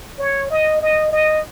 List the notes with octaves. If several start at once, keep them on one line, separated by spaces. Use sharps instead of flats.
C#5
D#5
D#5
D#5